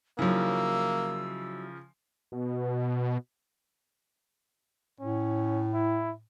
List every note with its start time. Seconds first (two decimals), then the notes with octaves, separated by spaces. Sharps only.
0.19 C#3 F3 F#3 A#3 D#4 E4 E6
2.32 B2
5.00 A2 C#4
5.73 E4